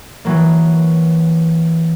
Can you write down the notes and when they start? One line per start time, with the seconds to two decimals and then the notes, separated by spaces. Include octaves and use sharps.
0.25 E3 F#3 A#3